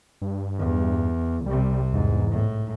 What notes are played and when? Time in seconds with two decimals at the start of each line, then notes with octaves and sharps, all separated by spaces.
0.22 G2
0.59 E2
1.46 C2 C3 G3
1.93 E2 G#2
2.32 A2